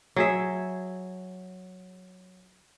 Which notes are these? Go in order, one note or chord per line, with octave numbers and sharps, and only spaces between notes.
F#3 G#4 E5